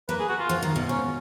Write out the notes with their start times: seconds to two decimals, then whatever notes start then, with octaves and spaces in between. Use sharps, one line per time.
0.09 A#3 B4
0.19 G#4
0.28 F#4
0.39 F4
0.49 F3
0.63 D#3
0.76 B2
0.89 G#2 C#4